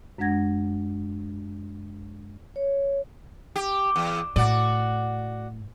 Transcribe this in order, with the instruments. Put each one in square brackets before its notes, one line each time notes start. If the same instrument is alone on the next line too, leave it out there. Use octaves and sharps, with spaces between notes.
[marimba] F#2 G#3 D4 F#5 G#6 A#6
[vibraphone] C#5
[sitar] G4
E2
[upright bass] A2 [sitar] F#4 D5